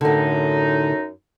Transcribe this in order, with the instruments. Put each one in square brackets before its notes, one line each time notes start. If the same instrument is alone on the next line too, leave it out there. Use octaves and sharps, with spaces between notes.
[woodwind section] F#2 D#4 [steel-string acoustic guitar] A2 D3